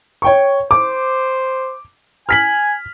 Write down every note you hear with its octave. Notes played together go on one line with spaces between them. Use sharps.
C#5 G5 C#6
C5 D6
G#5 F6 B6 F#7